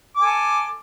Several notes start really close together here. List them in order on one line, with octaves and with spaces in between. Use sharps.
D6 G#5 A4